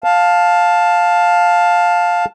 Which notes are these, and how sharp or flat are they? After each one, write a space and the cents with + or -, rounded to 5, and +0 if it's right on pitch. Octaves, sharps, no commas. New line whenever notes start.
F5 +10 A5 +0